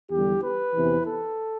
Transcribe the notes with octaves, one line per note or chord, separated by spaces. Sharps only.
E2 D3 G3 G4
B4
E2 C3 E3
A4